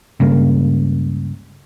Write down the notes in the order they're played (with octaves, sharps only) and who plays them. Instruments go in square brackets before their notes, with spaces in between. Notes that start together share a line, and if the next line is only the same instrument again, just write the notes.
[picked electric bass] C#2 G2 C#3 A#3